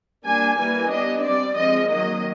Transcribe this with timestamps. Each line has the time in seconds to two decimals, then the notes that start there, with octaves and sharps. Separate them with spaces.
0.24 G3 A#3 D4 G#5
0.57 E3 G3 A#3 G#5
0.90 G3 B3 D4 D#5
1.23 G3 C4 D5
1.57 F3 G#3 C4 D#5
1.90 D#3 F#3 A#3 D#5